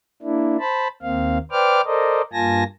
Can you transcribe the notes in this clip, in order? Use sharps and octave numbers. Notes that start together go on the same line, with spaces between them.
A#3 D4 E4
C5 A5 B5
D#2 A#3 C4 F5
B4 C5 D5 G5 D6 F6
A4 A#4 C5 D5 D#5
G2 A#3 F4 G#5 A5 A#6